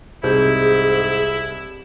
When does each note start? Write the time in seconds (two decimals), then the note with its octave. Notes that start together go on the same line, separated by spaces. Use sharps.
0.23 C2 G#2 E4 G#4 G6